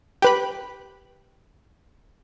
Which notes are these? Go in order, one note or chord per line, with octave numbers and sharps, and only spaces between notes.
G4 B4 B5